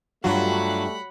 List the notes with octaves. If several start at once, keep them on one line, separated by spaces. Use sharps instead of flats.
G2 F#3 G3 A3 F4 F#4 F#5 B5